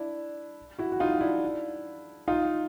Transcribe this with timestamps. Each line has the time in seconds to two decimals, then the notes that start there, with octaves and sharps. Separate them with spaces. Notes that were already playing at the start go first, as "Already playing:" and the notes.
Already playing: D4 E4
0.79 E4 F#4
0.92 F#4
1.00 D#4 F4
1.21 D4 E4
2.28 D#4 F4